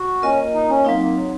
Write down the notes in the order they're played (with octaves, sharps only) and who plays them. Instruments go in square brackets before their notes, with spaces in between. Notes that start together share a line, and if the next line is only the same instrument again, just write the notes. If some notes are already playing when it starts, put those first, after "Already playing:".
Already playing: [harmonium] F#4
[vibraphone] A#3 F4 A#4 D#5 [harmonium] C#4
[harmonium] D#4
C#4
[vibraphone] F#3 C4 D#4 [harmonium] A#3
[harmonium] A#3
F#3